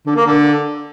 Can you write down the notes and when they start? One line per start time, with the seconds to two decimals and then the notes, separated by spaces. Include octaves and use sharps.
0.07 D3
0.16 A#3
0.25 D3